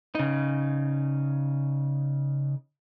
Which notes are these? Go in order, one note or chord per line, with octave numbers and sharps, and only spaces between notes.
C#3 D#4